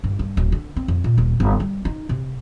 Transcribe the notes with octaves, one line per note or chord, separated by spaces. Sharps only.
G2
G2
D1
D3
C4
F2
A#2
D#1
G1
G3
D#4
C3